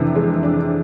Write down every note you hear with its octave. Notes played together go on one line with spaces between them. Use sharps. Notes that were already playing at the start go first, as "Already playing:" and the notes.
Already playing: F2 C3 E3 D4
G#3
D4